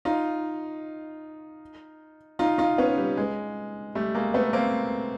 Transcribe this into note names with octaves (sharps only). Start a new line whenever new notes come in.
D#4 F4
D#4 F4
D#4 F4
B3 C#4
G3
G#3
G3 A3
G#3 A#3
A3 B3
A#3 C4